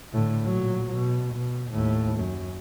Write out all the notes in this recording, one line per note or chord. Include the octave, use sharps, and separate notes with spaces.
A2 D3
A#2 F#3
B2
B2
D#2 A2
F#2